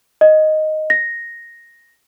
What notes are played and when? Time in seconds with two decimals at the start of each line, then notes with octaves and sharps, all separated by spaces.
0.21 D#5
0.90 A#6